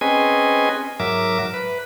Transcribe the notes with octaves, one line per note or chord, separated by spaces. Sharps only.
C4 C#4 G#4 B4 D#5 G#5
G#2 F#3 A#4 E5 D6
B4